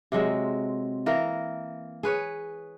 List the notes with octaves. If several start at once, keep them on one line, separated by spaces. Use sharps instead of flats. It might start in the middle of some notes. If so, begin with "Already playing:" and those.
C3 F#3 G#3 C4
E3 A#3 A#4
G#4 B4 C#5